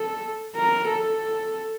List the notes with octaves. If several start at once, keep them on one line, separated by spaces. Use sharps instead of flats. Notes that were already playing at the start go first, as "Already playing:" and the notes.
Already playing: A4
A#4
A4